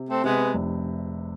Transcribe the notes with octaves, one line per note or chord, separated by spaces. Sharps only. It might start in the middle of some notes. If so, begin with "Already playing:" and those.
Already playing: C3
A3 C4
C3 G#3 B3
F1